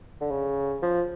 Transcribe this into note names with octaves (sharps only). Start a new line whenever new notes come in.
D3
C#3
F3